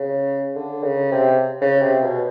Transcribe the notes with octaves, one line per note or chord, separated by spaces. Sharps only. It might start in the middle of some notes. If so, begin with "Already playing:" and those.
Already playing: C#3
D3
C#3
C3
C#3
C3
B2